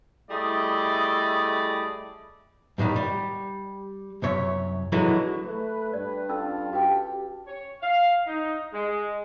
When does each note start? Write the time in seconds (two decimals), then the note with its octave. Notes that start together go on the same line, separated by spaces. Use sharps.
0.30 G3 A3 E4 G#4 D5 D#5
2.78 F#2 A2 D#3 G3 D#4
2.96 G3
4.22 C2 F#2 C#5 E5
4.92 D3 E3 F#3 G#3 E4 F#4
5.45 A3 B4
5.93 G2 D5
6.29 C#4 F4 A4 A5 E6
6.73 F#4 G4 B4 G5
7.47 C#5
7.82 F5
8.26 D#4
8.74 G#3